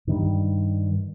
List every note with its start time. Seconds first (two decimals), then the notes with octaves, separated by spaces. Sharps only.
0.07 G2 D#3 G3